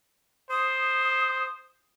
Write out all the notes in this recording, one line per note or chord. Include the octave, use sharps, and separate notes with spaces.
C5 D#6